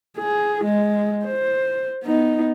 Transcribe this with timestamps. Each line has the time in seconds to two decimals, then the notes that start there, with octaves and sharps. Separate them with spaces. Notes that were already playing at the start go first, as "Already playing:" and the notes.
0.18 G#4
0.65 G#3
1.25 C5
2.04 B3 D#4